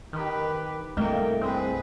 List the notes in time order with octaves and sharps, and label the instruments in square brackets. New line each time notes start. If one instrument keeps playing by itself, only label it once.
[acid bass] D#3 [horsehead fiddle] G4 B4
[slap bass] C2 G2 [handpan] A3 D#5 [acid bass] A#3 [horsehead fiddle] G5
[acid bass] C4 [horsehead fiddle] G#4 B4